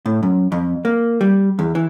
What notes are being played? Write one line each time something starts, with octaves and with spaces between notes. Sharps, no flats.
A2
F#2
F2
A#3
G3
E2
E3